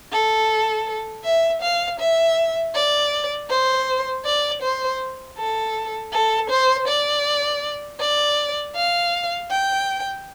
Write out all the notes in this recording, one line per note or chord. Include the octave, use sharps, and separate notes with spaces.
A4
E5
F5
E5
D5
C5
D5
C5
A4
A4
C5
D5
D5
F5
G5